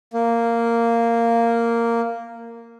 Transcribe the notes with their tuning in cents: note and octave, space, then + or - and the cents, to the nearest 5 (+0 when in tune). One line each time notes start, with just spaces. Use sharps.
A#3 -5